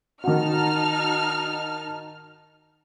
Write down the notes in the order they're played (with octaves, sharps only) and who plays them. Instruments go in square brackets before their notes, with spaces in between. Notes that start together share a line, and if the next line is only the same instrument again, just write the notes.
[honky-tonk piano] D#3 F#4 [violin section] D#4 A5 F6